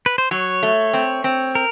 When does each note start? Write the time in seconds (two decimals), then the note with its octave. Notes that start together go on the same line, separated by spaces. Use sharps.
0.06 B4
0.18 C5
0.31 F#3 C#5
0.63 A3
0.94 C4
1.24 C4
1.55 A#4